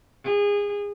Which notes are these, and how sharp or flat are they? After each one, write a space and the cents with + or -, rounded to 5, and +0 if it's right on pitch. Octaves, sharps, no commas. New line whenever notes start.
G#4 -25